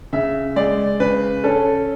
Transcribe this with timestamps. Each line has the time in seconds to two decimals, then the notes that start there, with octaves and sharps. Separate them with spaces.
0.13 C#3 E5
0.56 G#3 D5
1.00 C#3 B4
1.44 C#4 A4